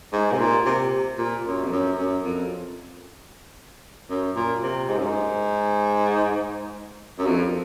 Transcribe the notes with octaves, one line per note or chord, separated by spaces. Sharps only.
G#2
C3
A#2
C3
A#2
F#2
F2
F#2
F#2
F2
F#2
A#2
C3
G#2
F#2
G#2
F#2
F2